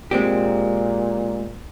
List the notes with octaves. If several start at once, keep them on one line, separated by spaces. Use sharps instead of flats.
A#2 G#3 C4 G4